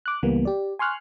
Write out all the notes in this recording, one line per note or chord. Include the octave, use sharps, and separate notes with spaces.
D6 F#6
C#2 E3 G3 A#3 B3
G4 D5
G#5 C6 C#6 F6 F#6